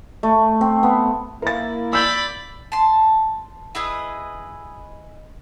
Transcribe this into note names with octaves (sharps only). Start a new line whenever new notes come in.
A3
C4
B3
A#3 E4 A#4 A6
D5 B5 E6 G6
A5 C6
E4 G#4 B4 D#5